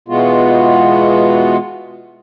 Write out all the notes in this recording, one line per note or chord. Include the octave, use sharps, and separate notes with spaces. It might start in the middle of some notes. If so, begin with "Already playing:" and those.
B2 E3 G#3 B3 F4 F#4